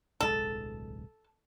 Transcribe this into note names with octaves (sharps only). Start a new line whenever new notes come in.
D1 B1 G#3 A4